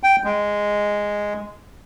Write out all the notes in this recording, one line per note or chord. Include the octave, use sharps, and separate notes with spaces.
G5
G#3